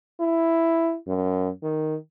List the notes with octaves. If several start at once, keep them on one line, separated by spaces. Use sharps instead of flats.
E4
F#2
D#3